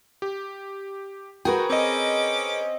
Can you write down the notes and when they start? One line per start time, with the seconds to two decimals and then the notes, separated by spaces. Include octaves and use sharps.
0.22 G4
1.45 F#4 G#4 A#4 B4 G5
1.70 C4 C#4 D#5 D6